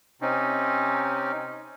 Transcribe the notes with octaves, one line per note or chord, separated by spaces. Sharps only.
C3 C4 C#4 D#4